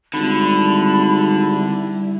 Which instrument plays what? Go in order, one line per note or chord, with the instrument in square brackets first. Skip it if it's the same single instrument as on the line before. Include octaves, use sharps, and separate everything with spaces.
[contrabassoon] G#1 [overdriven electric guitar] D3 [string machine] G3 E4 [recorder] B5